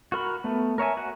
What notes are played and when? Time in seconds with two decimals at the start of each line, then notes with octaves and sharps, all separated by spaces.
0.12 F#4 A#4 B5
0.44 A3 B3
0.78 A#4 C#5 E5 G#5
0.97 F#4 F#5